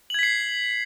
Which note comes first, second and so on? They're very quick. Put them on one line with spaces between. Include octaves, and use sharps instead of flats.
F#7 G#6 B6 C7